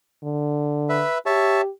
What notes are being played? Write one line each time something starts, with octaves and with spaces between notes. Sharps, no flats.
D3
B4 E5
G4 C#5 E5 A5